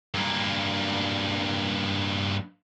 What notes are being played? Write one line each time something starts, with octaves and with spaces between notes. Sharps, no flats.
G2 A#3